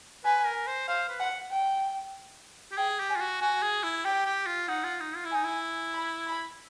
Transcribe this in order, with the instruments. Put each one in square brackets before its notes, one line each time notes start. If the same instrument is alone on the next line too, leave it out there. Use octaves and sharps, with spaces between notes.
[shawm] B4 [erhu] G#5
[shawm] A#4
C5
[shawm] C5 [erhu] F5
[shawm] B4
[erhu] F#5
G5
[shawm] G4
[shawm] G#4 [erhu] G5
[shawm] G4
[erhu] G#5
[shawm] F4
F#4
[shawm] F#4 [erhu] G#5
[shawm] G#4
E4
[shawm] G4 [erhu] G5
[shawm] G4
F4
[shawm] D#4 [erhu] F#5
[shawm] F4
D#4
F4
E4
[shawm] D#4 [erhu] G#5
[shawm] E4
[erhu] B5
B5